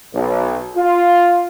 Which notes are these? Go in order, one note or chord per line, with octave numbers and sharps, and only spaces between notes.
B1
F4